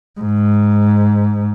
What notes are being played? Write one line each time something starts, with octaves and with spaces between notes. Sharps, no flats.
G#2